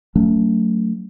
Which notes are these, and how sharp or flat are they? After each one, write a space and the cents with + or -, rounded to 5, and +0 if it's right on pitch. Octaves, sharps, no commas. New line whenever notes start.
F#3 +0 A3 +20 C#4 +30